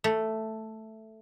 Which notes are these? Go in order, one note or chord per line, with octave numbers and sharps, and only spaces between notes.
A3